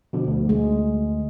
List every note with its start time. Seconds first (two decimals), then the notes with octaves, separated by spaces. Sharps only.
0.13 B2 D3 F3
0.27 D2
0.49 G#3